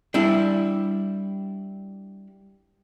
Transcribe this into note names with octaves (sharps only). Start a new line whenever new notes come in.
G3 D4 E4